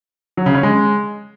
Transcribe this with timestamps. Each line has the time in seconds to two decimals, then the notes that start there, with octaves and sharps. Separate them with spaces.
0.37 F#3
0.46 C#3
0.55 C#4
0.63 G#3